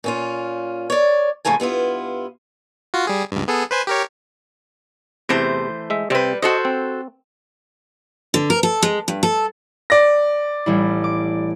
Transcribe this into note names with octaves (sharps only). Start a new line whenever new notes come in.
A#2 C#4 F4
C#5 D5
C#3 F3 A3 A#3 G#5
G2 B3 E4 F4
F4 F#4
G3 G#4
C#2 G2
B3 G#4 A4
B4 C5 G#5
G4 A#4 C#5
E2 C3 E3 A3 C5
G#3 E5
C3 G3 C4 B4
F#4 A4 C5 D#5
C4
D3
A#4
A4
G#3
G2
A4
D5 A#6
A1 G3 E4
D6